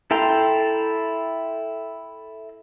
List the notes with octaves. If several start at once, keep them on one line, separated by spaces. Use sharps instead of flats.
E4 A4 G5 A#5 C6